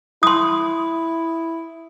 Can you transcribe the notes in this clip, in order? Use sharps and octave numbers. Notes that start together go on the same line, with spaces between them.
E4 C6 D#6